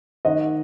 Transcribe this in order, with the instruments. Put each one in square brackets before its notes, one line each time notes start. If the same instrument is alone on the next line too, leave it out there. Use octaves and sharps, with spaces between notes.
[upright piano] D#3 D#5 F#5